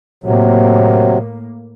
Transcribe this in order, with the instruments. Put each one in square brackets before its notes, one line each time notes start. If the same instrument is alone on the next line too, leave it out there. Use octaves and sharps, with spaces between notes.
[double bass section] A2 A#3 [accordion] C3 F#3